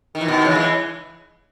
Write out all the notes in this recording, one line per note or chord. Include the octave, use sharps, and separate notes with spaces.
D#3
E3
B2 D#3
C#3 E3
E3 G#3